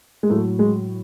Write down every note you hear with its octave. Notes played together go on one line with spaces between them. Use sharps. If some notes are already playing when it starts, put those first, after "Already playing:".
G#3
A2 F#3 A3
G#3